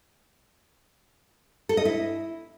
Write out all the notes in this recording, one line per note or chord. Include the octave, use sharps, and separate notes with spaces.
A4
D#5
E4